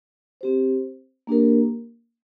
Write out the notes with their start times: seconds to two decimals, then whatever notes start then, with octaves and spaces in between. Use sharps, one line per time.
0.41 C4 G4 C5
1.27 A#3 D4 G4 A#4